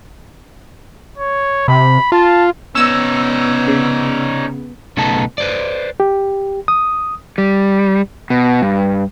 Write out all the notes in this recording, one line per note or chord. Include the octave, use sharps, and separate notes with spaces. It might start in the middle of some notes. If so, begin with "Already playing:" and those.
C#5
C3 B5
F4 A5
C3 B3 C#4 D#4 E6
C#3
B1 C#3 A3 B3 D#4 A5
B4 C5 D5
G4
D#6
G3
B2
G2